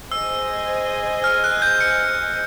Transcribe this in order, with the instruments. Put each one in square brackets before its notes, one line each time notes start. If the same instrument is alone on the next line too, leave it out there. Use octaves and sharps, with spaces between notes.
[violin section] G#4 C5 D#5 G#5 [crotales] E6
[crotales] F6
F#6
G6
C#7